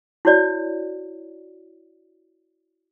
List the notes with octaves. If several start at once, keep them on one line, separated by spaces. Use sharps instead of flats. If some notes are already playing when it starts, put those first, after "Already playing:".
E4 F#4 C#5 D5